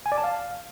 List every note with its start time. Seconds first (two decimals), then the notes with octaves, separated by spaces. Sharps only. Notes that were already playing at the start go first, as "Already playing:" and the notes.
0.06 G#5
0.12 D5
0.18 A5
0.24 F5